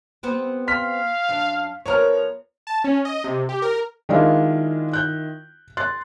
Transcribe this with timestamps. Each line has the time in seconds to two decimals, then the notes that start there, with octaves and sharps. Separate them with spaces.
0.23 G3 B3 C4
0.68 F5 C6 F6 B6
1.29 F#2 D4
1.86 F3 B3 A#4 C#5 A#5 F6
2.67 A5
2.84 C#4
3.05 D#5
3.24 C3
3.49 G4
3.62 A#4
4.09 D#3 G#3 D4 E4 F4 F5
4.93 F#6 G6
5.77 C6 F#6 A6